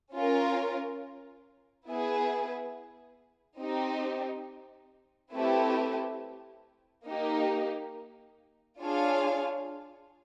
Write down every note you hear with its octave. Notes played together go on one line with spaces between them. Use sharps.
C#4 F4 A#4
B3 E4 G#4 B4
C4 D#4 G4
A3 C4 E4 G4 B4
A#3 D#4 G4
D4 F4 G#4 C#5 F5